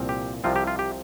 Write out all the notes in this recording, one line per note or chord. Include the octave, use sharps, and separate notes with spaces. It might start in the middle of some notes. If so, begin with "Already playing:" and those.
Already playing: C2 A#2 F3 C4
G4
C2 C3 F3 C4 F4
G4
F4
G4